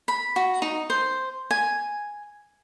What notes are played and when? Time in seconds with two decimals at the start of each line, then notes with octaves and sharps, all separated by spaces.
0.08 B5
0.36 F#4
0.62 D#4
0.90 C5
1.51 G#5